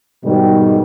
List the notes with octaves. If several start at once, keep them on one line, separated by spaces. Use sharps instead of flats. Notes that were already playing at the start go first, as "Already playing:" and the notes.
G#2 B2 D#3 G3 G#3